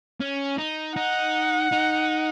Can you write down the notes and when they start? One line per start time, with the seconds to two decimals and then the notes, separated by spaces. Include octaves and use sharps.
0.21 C#4
0.58 D#4
0.96 D#4 F#5
1.72 D#4